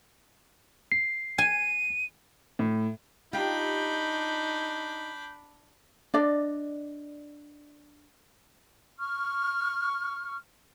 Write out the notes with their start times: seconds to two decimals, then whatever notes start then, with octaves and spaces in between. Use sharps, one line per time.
0.92 C7
1.38 G#5 D#7
2.59 A2
3.33 D4 D#4 F4 G4 B5 G6
6.14 D4 D5 D#5
8.99 C#6 F6